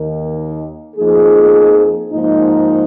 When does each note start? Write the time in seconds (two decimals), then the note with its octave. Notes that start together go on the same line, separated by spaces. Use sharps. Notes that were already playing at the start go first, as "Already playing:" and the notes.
Already playing: D#2 D#3 A#3
0.96 F2 F3 A#3 D#4 G#4
2.12 G#2 F3 A#3 D#4